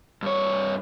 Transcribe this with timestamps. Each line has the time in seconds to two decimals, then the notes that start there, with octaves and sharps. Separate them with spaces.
0.23 G2 C#5